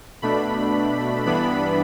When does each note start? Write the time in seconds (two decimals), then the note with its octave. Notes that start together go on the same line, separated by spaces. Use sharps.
0.22 B2 A3 D4 B5
1.26 G2 E3 B3 D4 B5